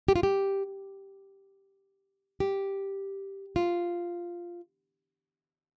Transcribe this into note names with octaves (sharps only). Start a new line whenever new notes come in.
G4
F4
G4
G4
F4